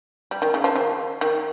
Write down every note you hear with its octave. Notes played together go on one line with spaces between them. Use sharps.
G3
D#3
C#3
F3
D#3
D#3